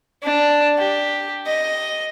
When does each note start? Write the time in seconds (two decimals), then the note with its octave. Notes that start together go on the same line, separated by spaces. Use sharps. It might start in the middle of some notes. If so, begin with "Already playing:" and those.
0.23 D4
0.78 G4
1.47 D#5